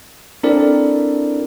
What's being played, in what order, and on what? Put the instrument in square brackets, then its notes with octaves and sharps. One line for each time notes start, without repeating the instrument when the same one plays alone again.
[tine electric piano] C4 D4 E4 A4 A#4 D5